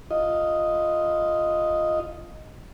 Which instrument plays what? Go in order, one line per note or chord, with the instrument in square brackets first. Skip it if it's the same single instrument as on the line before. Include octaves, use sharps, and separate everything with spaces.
[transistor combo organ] F4 D#5